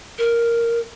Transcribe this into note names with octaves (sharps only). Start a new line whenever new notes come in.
A#4